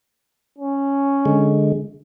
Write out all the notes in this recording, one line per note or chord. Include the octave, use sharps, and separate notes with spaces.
C#4
D3 G#3